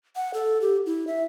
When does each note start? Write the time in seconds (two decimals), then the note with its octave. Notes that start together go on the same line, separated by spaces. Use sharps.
0.16 F#5
0.34 A4
0.61 G4
0.86 E4
1.07 E5